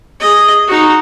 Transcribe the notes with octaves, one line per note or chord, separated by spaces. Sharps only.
G#4 D#5
D#4 F#4